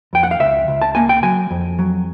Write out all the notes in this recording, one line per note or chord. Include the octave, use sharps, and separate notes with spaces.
F2 G5
F#5
F5
C#2 E5
C#2
A5
A#3 G#5
G5
F#3 G#5
F2
F#3